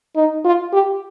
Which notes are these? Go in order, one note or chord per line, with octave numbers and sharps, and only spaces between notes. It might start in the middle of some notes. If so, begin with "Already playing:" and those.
D#4
F4
G4